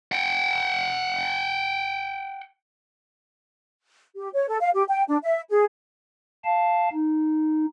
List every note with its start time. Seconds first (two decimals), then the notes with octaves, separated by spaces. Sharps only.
0.12 F#5 G5
4.16 G4
4.33 C#5
4.48 A4
4.60 F5
4.74 G4
4.88 G5
5.08 D4
5.23 E5
5.50 G#4
6.45 F5 A5
6.93 D#4